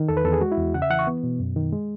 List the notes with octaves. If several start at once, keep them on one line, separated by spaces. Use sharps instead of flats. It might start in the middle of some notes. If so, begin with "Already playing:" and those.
Already playing: D#3
E2 A4
B4
E2 A4
G#4
G#3 F#4
E4
E2
C#3 F#5
E5
E3 F#5
C#6
B3
B2
F#2
D#3
G#3